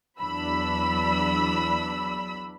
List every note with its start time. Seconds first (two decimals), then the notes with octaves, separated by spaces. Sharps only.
0.20 E2 F#3 D4 B5 E6